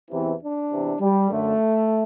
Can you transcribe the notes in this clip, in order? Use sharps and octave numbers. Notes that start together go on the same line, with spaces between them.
E2 C3 E3
D4
E2 C3 E3
G3
F#2 D3 A3